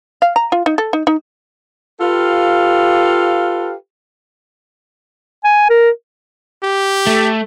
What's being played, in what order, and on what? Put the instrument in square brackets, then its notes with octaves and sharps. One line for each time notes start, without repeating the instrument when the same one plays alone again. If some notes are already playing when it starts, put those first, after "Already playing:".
[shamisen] F5
A#5
F4
D#4
A4
D#4
D#4
[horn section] F4 G4 A4 B4 F5
[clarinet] G#5
A#4
[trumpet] G4
[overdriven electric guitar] A3